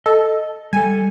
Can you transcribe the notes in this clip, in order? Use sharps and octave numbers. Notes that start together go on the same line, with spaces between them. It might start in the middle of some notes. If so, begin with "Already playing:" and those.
A4 D#5
G3 A4 G#5